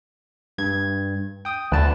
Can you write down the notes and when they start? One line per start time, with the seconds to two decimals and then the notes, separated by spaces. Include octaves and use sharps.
0.58 G2 G#6
1.45 G5 D#6
1.72 D2 B4 A5